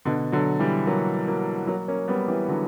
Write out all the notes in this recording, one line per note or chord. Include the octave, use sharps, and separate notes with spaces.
B2 D3
D3 F#3
E3 G3
F#3 A#3
F#3 A#3
F#3 A#3
A#3 C#4
G3 B3
E3 G3
D3 F#3